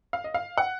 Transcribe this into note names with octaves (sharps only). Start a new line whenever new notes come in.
F5
D#5
F5
F#5